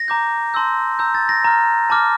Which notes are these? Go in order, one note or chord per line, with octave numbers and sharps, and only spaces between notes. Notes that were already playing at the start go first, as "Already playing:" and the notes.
Already playing: A#6
A#5 D6 G6
A5 C6 E6 G6
A#5 E6 G6
A6
A#6
A#5 F6
A5 D6 F6